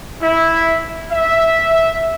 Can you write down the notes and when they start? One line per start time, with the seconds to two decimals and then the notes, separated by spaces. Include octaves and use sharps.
0.21 E4
1.11 E5